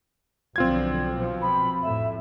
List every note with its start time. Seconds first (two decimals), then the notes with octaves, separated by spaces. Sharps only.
0.56 B1 D3 F3 C4 F4 G#6
1.12 B2 F3
1.41 B5
1.82 F2 A2 E5